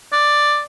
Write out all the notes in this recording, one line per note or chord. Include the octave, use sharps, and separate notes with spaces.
D5